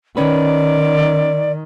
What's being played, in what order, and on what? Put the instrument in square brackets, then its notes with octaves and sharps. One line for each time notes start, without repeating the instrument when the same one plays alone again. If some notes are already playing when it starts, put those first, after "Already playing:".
[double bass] D#3 [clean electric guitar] C#4 B4 [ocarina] D5